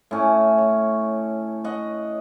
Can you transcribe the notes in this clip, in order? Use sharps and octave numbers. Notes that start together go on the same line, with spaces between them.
A2 C#4
C#5
D#5 F#5